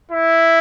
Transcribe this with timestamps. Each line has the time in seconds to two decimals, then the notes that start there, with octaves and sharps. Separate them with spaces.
0.11 E4